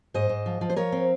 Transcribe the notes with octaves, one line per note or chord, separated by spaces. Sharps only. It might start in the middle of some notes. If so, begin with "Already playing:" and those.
G#2 C5 D#5
G#2
F3
F3
C5
F3 A#4 C#5
C4